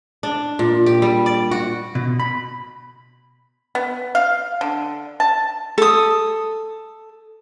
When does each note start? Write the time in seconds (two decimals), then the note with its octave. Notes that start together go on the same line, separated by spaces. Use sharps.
0.23 D4
0.59 A#2
0.86 G4
1.02 G3
1.26 D5
1.51 F#4
1.95 B2
2.20 B5
3.75 B3
4.15 F5
4.61 D3
5.20 A5
5.78 A4 D#6